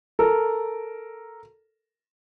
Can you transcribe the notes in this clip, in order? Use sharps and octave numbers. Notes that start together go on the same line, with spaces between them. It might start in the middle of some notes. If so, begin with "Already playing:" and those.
A4 A#4